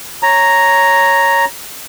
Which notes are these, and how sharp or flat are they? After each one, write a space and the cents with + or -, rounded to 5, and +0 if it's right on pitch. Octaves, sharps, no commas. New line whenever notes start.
C#5 +0 A#5 +0